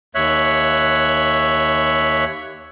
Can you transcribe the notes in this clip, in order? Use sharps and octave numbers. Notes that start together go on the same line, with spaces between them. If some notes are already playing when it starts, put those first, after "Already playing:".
D#2 C#5 E5 F#6